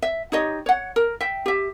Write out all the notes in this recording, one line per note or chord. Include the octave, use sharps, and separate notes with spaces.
E5
D#4 G4 C#5 D#5
C#5 F#5
A#4
E5 G5
G4 E5